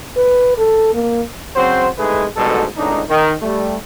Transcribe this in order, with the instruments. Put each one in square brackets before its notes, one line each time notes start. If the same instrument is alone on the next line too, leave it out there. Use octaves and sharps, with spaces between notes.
[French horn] B4
A4
A#3
[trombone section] C#3 F#3 C4 F#4 C5
C2 G#3 A3 D#4 G#4 B4
D2 G#2 B2 G3 A4
G#1 C#2 A2 D4 D#4
D#3
G3 A3